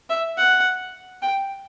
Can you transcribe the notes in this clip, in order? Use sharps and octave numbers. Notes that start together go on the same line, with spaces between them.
E5
F#5
G5